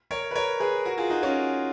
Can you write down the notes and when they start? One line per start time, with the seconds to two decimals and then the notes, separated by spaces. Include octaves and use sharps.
0.11 A#4 C#5
0.31 B4
0.35 A#4 C#5
0.60 G#4 B4
0.85 F#4 A#4
0.98 F4 G#4
1.10 D#4 F#4
1.23 C#4 F4